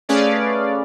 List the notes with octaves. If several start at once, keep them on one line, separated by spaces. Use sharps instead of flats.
A3 C#4 G#4 B4 D5 F5